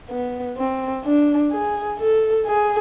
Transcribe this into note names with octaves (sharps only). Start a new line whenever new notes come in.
B3
C4
D4
G#4
A4
G#4